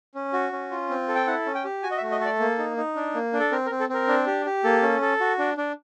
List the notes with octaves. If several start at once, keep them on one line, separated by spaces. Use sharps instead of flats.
C#4
F#4
C#4
F4
C4
A4
G5
E4 F#5
C#4
G5
G4
F#4 G#5
D#5
E5
A3
D#5
A4 D5
A#3
D#4
D#4
D4
A#3
D4
A4
C4 A#4
A#4
C4
A4
C4 A#4
D4
G4
G4
A#3 A4
C#4
A4
F#4
D4
D4